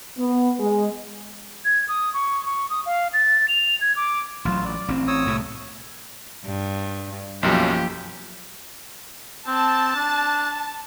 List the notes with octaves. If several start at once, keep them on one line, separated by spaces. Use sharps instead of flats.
B3
G#3
G#6
D#6
C#6
C#6
D#6
F5
A6
F7
G#6
D6
A1 F#3 F4
D5
A1 C4
C#5 D#6 E6
C2 A2 A3
G2
B1 F#2 F3 A#3 G4
C4 A5
D4